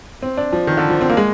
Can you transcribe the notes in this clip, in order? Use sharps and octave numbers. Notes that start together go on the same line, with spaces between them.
C4
D4
F3
D#3
D3
F3
C4
A#3
G#3